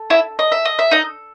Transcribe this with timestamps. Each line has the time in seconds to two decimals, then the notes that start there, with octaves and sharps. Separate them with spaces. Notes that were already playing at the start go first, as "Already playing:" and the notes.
Already playing: A4
0.10 E4 E5
0.39 D#5
0.52 E5
0.65 D#5
0.79 E5
0.91 D#4 D#5